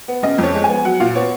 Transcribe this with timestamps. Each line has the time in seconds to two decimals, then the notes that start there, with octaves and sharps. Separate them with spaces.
0.08 B3
0.23 C#3 D#5
0.38 F2
0.44 C#5
0.54 G#3
0.64 G#5
0.69 B3
0.85 F#3 F#5
1.00 A#2 F5
1.15 B3 C#5